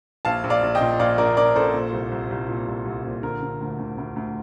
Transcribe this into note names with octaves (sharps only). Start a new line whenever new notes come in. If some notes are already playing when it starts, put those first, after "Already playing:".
A#1 F5 A5
A#1
D5 F5
A#1
D#5 G5
A#2
A#1 D5 F5
A#1 A#4 D5
A#1 A#4 D5
A#1 A4 C5
A#2
C2
C2
C2
A#2
C2
C2
A#2
D3 A#4
D3
D2
D2
D2
D2